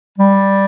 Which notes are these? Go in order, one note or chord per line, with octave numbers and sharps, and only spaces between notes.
G3